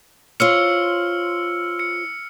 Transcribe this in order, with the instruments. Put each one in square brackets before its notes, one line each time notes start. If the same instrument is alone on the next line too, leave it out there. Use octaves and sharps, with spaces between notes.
[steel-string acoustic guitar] F4 C5 C#5 [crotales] E6 F6 C#7
[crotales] C#7